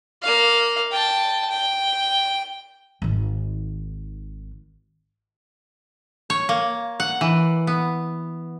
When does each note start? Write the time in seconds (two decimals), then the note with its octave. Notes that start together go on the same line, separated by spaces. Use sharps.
0.22 A#3 F5
0.92 G5 A5
1.50 G5
3.02 G#1 D#3
6.30 C#5
6.49 A#3
7.00 F#5
7.21 E3
7.67 B3